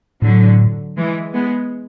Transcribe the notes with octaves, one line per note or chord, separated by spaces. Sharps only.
A2 D3 F#3
E3 G#3
G#3 B3